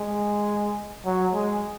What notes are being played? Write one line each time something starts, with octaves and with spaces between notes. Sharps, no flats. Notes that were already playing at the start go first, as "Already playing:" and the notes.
Already playing: G#3
F#3
G#3